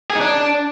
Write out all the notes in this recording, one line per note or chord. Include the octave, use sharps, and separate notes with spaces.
G#4
D#4
D4